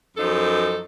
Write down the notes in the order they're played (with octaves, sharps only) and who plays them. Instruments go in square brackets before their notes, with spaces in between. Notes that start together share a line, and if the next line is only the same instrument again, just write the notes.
[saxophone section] F#2 F3 D#4 A4